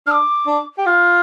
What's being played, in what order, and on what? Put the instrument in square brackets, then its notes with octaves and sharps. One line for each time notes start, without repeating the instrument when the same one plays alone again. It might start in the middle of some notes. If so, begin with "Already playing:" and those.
[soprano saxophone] D4 [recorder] D6 F6
[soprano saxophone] D4
G4
[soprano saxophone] F4 [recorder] F6